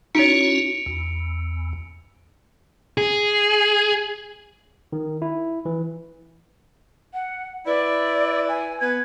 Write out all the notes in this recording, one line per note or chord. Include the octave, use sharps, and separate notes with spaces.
C#4 D#4 E4 F#4 C#5 C#7 D7 F7
E2
G#4
D#3
E4
E3
F#5
E4 B4 D5
G#5
B3 B4 G#6